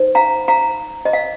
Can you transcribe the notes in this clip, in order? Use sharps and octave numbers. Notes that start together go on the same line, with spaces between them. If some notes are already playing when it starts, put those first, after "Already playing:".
Already playing: D#4 C5
F5 A#5
F5 A#5
D#5
F5